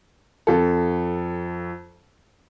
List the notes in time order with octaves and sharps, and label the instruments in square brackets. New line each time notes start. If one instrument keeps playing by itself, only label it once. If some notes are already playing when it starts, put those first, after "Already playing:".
[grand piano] F2 A4